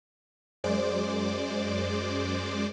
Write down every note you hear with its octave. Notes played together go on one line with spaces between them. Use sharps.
F#2 G#3 C5 D5 D6